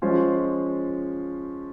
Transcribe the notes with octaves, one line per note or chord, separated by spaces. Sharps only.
F3 G#3 C#4 F4 C5